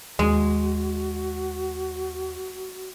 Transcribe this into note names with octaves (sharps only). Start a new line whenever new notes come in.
D#2 G#3 F#4